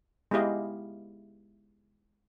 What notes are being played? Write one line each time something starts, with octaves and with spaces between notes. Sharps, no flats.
G#3 B3 E4 G4 D#5 F5